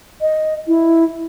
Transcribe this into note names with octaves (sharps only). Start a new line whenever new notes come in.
D#5
E4